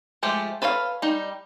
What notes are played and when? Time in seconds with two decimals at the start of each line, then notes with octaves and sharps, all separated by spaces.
0.23 F3 G#3 A3 G4
0.62 A4 B4 C#5 D#5 F5
1.02 G3 D#4